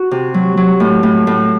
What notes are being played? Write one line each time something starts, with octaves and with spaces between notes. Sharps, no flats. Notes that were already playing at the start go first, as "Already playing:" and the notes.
Already playing: F#4
C3
F#3
F#3
A2
A2
A2